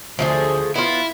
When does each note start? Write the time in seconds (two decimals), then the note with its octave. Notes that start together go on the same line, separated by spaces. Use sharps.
0.19 D2 F3 A3 G#4
0.76 B3 E4 F4